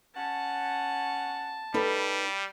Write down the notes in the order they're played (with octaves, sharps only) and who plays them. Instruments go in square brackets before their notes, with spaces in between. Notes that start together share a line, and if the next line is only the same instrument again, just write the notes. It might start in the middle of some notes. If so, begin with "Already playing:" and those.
[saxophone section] C#4 F#5 [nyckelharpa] A5
[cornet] G3 [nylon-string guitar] D#4 A4 B4